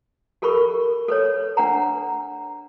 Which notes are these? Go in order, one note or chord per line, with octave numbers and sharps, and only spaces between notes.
G4 A4 A#4 B5 C#6
A4 B4 C#5
D4 B4 F#5 A#5